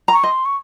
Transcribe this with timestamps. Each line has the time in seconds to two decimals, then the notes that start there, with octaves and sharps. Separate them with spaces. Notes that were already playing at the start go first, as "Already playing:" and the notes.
0.08 A#5
0.13 C#6
0.23 D#5 C6
0.45 C#6